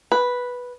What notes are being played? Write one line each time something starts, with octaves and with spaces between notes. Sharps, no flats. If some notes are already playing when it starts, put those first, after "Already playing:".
B4